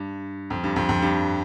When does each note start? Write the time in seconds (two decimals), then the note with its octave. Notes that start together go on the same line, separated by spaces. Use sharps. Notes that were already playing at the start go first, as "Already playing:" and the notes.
Already playing: G2
0.50 F2
0.64 G2
0.76 F2
0.89 F2
1.02 G2